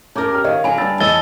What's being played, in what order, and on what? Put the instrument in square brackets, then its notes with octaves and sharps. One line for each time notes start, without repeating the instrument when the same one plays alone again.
[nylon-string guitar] C#4 A#4 [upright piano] A5 D6 G6
[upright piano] G4 F6
[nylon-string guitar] D#3 [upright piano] C#5 D#5 F5
[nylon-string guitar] D3 F#3 [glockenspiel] G#5 B5
[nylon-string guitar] G2 D4 [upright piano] E6 A6
[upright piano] E2 [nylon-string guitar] C#5 D#5 A5 [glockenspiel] E6 A6 G7